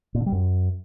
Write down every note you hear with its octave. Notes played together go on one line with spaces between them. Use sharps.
A#2
D3
G3
F#2